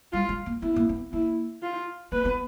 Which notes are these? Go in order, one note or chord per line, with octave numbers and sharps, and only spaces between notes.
G3 F4
G#3
A#3
B3 E4
A#3
B3
A#3 E4
F4
A#3 B4
B3